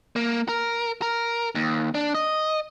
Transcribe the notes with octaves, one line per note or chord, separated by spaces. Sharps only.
A#3
A#4
A#4
D#2
D4
D#5